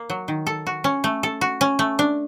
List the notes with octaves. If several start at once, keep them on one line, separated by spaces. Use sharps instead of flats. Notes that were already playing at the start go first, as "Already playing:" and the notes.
Already playing: A#3
F#3
D#3
A4
F#4
C#4
A3
A4
F#4
C#4
A3
D4